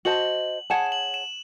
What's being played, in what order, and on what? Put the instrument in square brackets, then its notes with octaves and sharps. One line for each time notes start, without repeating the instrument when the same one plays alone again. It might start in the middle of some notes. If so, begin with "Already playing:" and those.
[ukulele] F#4 C5 D#5 A5 [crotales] F#7
[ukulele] G#4 C#5 F#5 A5 [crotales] E7
[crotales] E7
F#7
E7